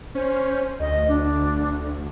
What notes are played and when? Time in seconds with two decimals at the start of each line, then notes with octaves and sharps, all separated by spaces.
0.15 C#4 C5
0.80 D2 D#5
1.08 D4